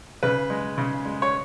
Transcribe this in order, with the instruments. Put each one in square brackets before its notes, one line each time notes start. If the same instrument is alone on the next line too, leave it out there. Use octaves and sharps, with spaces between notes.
[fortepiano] C#3 B4
G#3
C#3
G#3
C#5